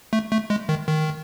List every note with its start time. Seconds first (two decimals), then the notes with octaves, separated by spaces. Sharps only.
0.13 A3
0.32 A3
0.50 G#3
0.69 D#3
0.87 D#3